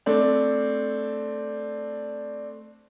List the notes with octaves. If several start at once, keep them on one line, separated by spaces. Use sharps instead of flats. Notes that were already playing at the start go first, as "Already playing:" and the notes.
A3 C4 D4